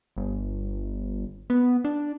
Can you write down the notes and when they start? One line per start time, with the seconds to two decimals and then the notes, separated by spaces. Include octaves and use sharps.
0.17 G1
1.50 B3
1.85 D4